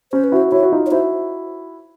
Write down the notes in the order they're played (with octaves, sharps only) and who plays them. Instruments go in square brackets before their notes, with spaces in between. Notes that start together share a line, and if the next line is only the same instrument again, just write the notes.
[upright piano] C#4 [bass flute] C5
[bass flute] B4
[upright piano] E4 F#4 [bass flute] C5
[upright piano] E4 F#4 [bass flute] C#5
[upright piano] F#4
D#4 F4
[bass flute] C#5
[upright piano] E4 F#4 [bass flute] C5